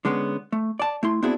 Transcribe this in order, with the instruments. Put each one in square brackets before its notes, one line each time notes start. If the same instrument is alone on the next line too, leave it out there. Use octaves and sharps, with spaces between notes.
[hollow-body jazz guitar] D3 G#3 B3 C#4
A3
D5 A5
A3 E4 C6
B3 C4 D4 E4 F#4 G#4